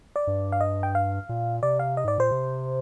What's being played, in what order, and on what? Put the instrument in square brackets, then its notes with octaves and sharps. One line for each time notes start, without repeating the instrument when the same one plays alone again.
[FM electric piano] D5
[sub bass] G2
[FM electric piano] F5
D#5
G5
F5
[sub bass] A#2
[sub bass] C3 [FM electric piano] D5
[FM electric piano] F5
D#5
[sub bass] G#2 [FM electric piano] D5
[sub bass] A#2 [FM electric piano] C5
[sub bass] C3